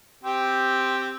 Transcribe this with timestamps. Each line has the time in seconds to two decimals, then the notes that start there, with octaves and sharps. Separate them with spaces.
0.23 C4 G4